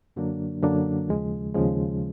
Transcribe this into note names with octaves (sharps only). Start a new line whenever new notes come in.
F#2 D3 F#3 A#3 D4
F#2 D3 F#3 A#3 D4
D#2 C#3 F3 G#3
D#2 C#3 F3 G#3